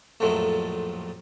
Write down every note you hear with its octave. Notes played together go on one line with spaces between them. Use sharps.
A#1 F2 A2 F3 F#3 A3